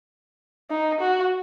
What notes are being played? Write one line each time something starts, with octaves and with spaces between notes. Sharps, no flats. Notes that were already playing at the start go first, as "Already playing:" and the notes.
D#4
F#4